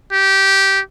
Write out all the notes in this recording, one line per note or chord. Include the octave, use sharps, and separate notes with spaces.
G4